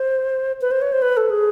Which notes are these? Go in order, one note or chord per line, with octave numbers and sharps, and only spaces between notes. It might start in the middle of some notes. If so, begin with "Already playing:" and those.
Already playing: C5
B4
C5
C#5
C5
B4
A4
G#4